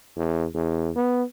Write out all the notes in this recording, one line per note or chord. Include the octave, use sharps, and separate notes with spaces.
E2
E2
B3